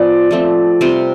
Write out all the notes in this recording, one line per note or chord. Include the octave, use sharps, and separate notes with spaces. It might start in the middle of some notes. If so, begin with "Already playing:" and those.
Already playing: F3 B3 F4 D5
F3 A3 C4
C3 G3 C4 F4